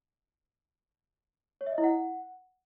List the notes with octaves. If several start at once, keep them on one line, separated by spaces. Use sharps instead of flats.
C#5
E5
D#5
E4
F#5